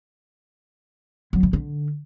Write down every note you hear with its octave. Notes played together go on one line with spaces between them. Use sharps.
F#3
C#3
D3